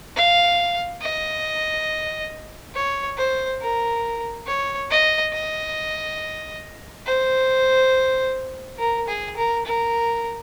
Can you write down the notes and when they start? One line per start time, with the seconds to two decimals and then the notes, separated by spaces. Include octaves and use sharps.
0.16 F5
1.02 D#5
2.75 C#5
3.18 C5
3.61 A#4
4.47 C#5
4.90 D#5
5.33 D#5
7.06 C5
8.79 A#4
9.08 G#4
9.37 A#4
9.65 A#4